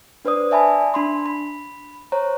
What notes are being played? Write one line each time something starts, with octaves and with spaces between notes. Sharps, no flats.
D4 B4 C5 D5 D#6
D5 E5 G#5 A5 B5
D4 B5 C6
B5
C5 C#5 A#5